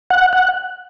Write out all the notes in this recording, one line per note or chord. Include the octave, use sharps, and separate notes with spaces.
F#5
F#5